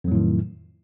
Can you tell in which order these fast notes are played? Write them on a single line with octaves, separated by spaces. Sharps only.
F2 F#3 A2 D#3